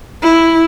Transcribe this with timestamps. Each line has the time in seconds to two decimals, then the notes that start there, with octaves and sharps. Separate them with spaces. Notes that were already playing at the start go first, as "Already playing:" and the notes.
0.23 E4